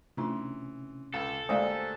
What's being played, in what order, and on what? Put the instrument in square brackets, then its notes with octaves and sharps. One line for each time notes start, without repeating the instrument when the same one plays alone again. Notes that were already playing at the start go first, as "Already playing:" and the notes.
[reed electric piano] C3 C#4 [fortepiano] E3 C6 [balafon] A3 D4 F4
[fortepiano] C#2 [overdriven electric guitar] A4
[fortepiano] D2 A#3 G4 [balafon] G#3 D5 F5 [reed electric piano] C5 G#5